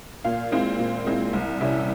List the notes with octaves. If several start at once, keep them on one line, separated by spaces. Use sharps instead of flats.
A#2 F5
G#3 C4 E4
A#2
G#3 C4 E4
C2
C3 G3 C#4 E4 E5